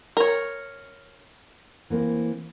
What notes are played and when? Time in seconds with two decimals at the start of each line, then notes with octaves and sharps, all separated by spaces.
0.17 A#4 C#5
1.90 E3 A#3 C4